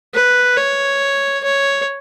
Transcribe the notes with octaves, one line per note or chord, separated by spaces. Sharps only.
B4
C#5
C#5